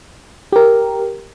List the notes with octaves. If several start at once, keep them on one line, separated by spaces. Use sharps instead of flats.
G4 A#4